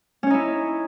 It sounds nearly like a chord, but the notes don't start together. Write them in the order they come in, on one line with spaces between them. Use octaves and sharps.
C#4 C#5 D#4 E4